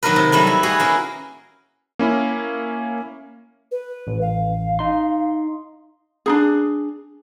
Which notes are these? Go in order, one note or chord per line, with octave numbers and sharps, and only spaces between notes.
D#3 F#3 A#3 D#4 A#4 B4
C3
F#3 G3 A3 B3
E4
B3 F#4 G#4
A#3 C#4 E4
A#3 C#4 E4
B4
A1
F5
D#4 C6
D4 D#4 G#4